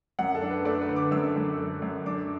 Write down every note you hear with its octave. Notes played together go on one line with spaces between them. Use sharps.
F#2 F#5
A4
D4
B4
A3 D5
B4
D3
D6
F#2 E6
F#2
A3
F#2
D4 D6